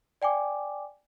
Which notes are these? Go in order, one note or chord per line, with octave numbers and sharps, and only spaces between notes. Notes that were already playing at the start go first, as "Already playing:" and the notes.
D5 G5 G#5 D6